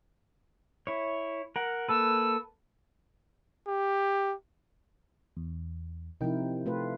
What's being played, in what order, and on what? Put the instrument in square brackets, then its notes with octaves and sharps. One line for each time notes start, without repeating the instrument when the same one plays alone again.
[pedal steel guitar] E4 C#5
A#4 F#5
[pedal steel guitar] A#3 A4 B4 [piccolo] E6
[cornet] G4
[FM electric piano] E2
[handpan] C3 F3 E4 [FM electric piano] D#4 A#4 G5
[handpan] A3 F4 B4